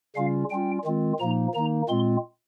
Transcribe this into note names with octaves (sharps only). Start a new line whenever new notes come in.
C#3 G3 C#4 F4 F5
G3 C#4 F4 G5
D#3 G#3 C4 F4
A#2 F3 A#3 D#4 A#5
D#3 A#3 D#4 A#5
A#2 G#3 C4 F4 C6